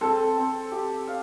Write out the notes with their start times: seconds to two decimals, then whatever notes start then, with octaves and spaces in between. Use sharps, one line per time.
0.01 C4 A4
0.37 C4
0.72 G4
1.07 F5